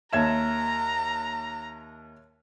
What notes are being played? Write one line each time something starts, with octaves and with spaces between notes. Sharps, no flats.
D#2 C#5 E5 A5 A#5 G#6 E7